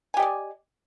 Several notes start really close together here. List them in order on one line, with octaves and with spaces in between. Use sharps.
G#5 G4 D#5 D5